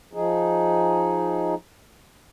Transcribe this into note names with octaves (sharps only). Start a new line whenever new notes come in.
F3 D#4 G#4